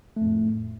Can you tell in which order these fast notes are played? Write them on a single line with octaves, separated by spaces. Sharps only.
A3 F2 A2